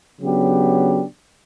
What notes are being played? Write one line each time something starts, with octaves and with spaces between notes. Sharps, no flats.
C#3 F#3 B3 D4 G4